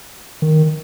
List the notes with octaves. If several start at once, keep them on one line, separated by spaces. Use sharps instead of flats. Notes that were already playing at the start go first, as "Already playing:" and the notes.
D#3